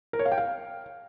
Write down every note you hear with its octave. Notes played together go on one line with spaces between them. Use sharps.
A#4
C#5
F5
G5
F5